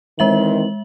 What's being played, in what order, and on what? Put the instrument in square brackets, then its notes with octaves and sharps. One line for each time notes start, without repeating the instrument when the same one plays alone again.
[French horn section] D#3 E3 C4 [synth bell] G#3 E5 F#7